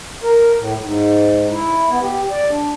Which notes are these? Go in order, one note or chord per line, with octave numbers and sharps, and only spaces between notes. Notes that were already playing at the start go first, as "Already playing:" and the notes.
A#4
A2
G#2
E4
B3
G4
D5
D4